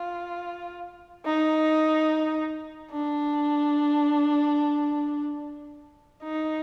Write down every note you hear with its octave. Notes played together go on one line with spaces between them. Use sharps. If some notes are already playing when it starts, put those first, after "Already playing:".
Already playing: F4
D#4
D4
D#4